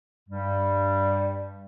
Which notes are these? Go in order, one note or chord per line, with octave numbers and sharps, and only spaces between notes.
G2 G3